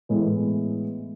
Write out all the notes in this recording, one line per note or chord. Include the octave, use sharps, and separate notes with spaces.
A2 E3 G#3 B3 E4